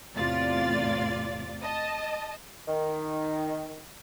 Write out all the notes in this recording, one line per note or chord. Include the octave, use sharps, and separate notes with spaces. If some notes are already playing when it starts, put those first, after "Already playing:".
E2 A2 C3 F4 D5 A6
D#5 A5
D#3